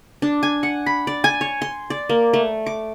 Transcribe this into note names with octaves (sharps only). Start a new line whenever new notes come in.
D4
G#5
F#5
B5
D5
G#5
C#5
C6
D5
A#3
A3
D6